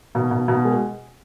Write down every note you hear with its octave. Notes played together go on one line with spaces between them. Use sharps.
B2
B2
B2
G#3